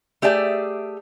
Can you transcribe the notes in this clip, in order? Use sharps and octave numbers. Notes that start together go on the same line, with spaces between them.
A3 G4 G#4 D5 E5